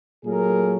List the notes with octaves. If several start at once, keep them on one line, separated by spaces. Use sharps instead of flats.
A#2 F#3 A3 G#4 A#4